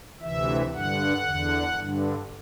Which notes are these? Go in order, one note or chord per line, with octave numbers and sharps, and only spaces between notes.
D2 C3 E3 E5
G2 D3 F#5
E2 D3
G2 D3